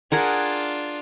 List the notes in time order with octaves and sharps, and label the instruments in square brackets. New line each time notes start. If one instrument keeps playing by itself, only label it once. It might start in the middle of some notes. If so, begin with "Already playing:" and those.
[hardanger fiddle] D4 F4 [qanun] G#4 A#4 F#5